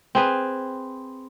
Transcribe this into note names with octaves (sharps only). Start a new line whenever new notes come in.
C4 G#4 B4